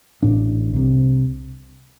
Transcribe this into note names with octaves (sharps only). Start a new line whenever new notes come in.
A1 A2 D4
C2 C3